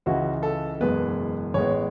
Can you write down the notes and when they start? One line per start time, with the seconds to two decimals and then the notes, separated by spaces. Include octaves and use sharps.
0.06 C#2 C#3 E3 F#4
0.43 A4
0.81 F#1 E2 B2 G#3 B3 B4
1.54 A1 A2 G#3 B3 C#5